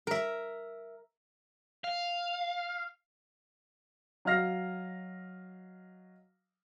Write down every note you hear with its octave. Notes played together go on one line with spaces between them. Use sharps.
A#4 E5
F5
F#3 D#5 F5 F6 A#6 C7